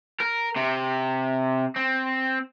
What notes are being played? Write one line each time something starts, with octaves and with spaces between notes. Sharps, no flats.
A#4
C3
C4